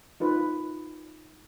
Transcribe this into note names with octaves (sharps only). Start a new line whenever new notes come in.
D#4 F4 B4